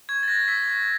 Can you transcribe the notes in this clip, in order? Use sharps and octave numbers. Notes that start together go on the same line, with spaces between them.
C#6 G#6
A6
F#6 A#6
E6 B6
C#6